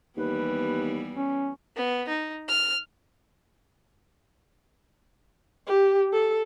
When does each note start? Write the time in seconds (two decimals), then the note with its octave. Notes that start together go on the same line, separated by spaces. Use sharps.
0.17 D#2 E3 G3 B3 B4
1.16 C#4
1.76 B3
2.08 D#4
2.48 F6
5.67 G4
6.13 A4